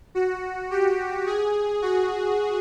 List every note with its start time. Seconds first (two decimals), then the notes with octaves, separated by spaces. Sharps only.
0.15 F#4
0.71 G4
1.26 G#4
1.82 F#4